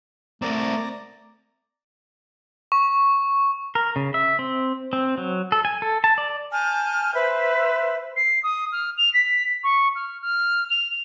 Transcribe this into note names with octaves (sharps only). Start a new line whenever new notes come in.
A3 C4 A#4 D5 A#5
C#6
A#4
C#3
E5
C4
C4
F#3
A4
G#5
A4
A5
D5
G#5 A5 F6 G6
B4 C5 E5
C7
D#6
F6
F7
B6
C#6
F6
F6
F7